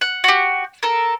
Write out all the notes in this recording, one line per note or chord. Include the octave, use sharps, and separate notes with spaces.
F#5
F#4 G4
A4 A#4